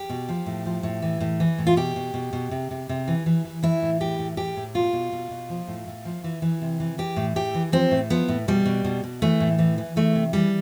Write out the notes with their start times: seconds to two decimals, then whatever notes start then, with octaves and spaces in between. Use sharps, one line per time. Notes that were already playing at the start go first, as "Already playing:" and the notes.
Already playing: G4
0.09 B2
0.29 F3
0.46 A2
0.65 F3
0.83 A2
1.02 E3
1.21 A2
1.40 E3
1.58 A2
1.67 F4
1.76 B2 G4
1.96 B2
2.14 B2
2.33 B2
2.51 C3
2.71 C3
2.89 C3
3.08 E3
3.26 E3
3.45 E3
3.63 E3 E4
3.82 A2
4.00 E3 G4
4.19 A2
4.37 A2 G4
4.56 A2
4.75 B2 F4
4.93 B2
5.12 B2
5.31 B2
5.49 F3
5.68 A2
5.87 A2
6.05 F3
6.24 E3
6.42 E3
6.61 C3
6.80 E3
6.98 E3 G4
7.16 A2
7.36 A2 G4
7.54 E3
7.72 F3 C4
7.91 A2
8.10 F3 B3
8.28 A2
8.48 B2 G3
8.65 B2
8.84 B2
9.04 B2
9.22 E3 A3
9.40 A2
9.59 E3
9.78 E3
9.96 E3 A3
10.15 C3
10.33 E3 G3